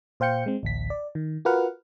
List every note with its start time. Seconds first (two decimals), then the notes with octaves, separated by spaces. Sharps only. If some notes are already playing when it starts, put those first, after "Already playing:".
0.20 A#2 C5 F5 G5 G6 C#7
0.46 G#3 C4
0.63 A1 D2 B6
0.90 D5
1.15 D#3
1.45 F4 F#4 A#4 B4 F#5 F6